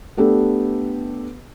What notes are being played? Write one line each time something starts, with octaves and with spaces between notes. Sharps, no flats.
A3 B3 D4 G4 A4 B4